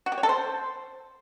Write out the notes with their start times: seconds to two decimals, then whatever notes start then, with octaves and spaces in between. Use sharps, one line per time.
0.06 F#4
0.12 G4
0.18 C#5
0.23 A4
0.29 C5